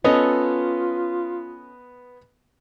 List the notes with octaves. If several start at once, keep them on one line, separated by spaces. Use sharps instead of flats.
B3 C#4 F4 A4 D#5 A#5